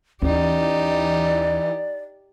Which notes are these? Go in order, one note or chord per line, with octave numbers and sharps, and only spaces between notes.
D#2 E3 C#4 D#4 G4 D5